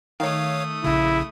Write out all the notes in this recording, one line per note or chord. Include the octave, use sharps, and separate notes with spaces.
D#3 A3 C#5 F5 D#6
A#1 C#3 E4